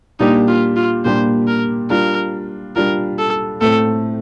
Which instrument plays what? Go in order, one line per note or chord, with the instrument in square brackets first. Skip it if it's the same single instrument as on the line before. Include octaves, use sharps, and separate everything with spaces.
[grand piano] A#2 G3 A#3 D4 G4 [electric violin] D#4
[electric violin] F4
F4
[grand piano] A#2 G3 A#3 D4 G4 [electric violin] C5
[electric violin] A#4
[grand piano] G3 D4 F4 [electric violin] A#4
[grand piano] G3 D4 F4 [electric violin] A#4
[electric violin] A4
[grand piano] A2 A3 C4 [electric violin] A4